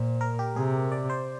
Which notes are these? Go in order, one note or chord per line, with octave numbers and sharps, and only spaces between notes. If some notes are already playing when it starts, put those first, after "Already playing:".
Already playing: A#2 C5
A#4
G4
C3 G#4
D5
C5